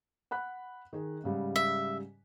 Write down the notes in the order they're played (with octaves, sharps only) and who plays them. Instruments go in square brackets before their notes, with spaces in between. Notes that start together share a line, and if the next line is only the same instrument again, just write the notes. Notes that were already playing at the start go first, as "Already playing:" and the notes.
[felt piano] F#5 B5 F#6
D#3 G#4
G#2 C#3 G3
[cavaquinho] E5